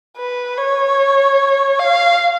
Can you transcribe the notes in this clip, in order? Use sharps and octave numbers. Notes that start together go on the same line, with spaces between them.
B4
C#5
F5